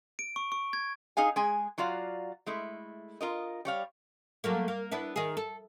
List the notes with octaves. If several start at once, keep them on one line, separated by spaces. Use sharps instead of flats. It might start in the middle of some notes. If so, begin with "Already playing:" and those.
D7
C#6
C#6
G#6
D#4 G#4 F5 G#5
G#3 G#4 G#5
F#3 F4 F#4 D5 F5
G#3 A3 E4
F4 A#4 D#5
G3 C#5 F5
F#3 A3 A#3
A#3
B3 D4 E4
D#3 G#4
A4